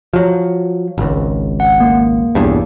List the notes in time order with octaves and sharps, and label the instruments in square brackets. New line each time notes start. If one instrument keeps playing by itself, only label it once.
[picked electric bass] F3 F#3
G#1 C#2
[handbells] F#5
A#3
[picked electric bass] B1 E2 G2